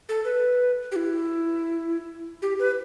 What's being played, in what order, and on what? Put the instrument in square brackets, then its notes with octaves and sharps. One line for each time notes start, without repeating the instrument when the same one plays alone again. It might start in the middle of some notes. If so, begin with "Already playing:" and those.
[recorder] A4
B4
G4
E4
G4
B4